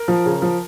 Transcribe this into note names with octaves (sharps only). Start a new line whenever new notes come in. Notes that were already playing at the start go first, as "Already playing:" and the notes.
Already playing: A#4
F3
C#3
F3